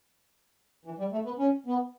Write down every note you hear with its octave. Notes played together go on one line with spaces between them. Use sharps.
E3
G3
A3
B3
C#4
B3